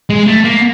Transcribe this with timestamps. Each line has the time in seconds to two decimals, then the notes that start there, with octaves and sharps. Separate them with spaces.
0.10 G#3
0.27 A3
0.44 A#3